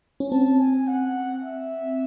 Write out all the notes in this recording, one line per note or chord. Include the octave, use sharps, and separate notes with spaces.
C#4
C4 A5
G#5
F#5
E5